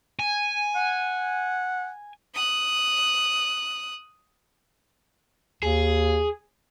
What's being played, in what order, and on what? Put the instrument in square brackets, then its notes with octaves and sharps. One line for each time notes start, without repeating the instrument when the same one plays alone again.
[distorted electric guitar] G#5
[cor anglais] F#5
[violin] D#6 F#6
[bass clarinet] D#2 [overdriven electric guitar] G#4